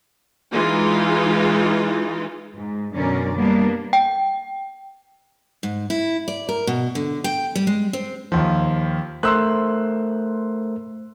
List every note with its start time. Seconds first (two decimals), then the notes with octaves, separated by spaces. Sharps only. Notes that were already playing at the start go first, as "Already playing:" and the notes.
0.53 E3 G#3 D#4 F4
2.56 G#2
2.94 F#2 B2 D3 C#4 A#4 D5
3.37 G3 A#3 B3 D4
3.93 G5
5.63 G#2
5.90 E4
6.28 D5
6.49 A#4
6.67 B2
6.95 D3
7.24 G5
7.55 G3
7.67 G#3
7.93 C4
8.32 D#2 F3
9.23 A3 A#4 C5 C6 E6 F#6